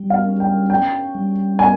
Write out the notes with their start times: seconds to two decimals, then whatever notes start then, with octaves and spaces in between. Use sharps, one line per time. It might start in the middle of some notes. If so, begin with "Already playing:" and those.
Already playing: G3
0.10 F5
0.25 C#4
0.40 G5
0.70 C#4 G5
1.15 G3
1.59 C#4 G#5